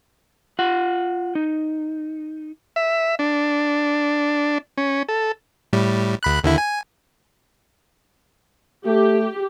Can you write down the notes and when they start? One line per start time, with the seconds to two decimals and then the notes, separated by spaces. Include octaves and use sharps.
0.59 F4 F#5
1.35 D#4
2.76 E5
3.19 D4
4.78 C#4
5.09 A4
5.73 A2 G3
6.23 D2 B5 F#6
6.44 D#2 D3 E4
6.58 G#5
8.86 A3 G4